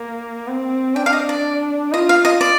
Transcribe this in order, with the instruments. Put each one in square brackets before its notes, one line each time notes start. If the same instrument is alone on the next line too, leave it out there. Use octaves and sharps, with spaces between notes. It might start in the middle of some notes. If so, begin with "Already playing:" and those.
Already playing: [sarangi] A#3
C4
[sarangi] D4 [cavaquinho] G5
[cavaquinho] F5
D#5
D5
[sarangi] F4 [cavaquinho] D#5
[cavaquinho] F5
D#5
D5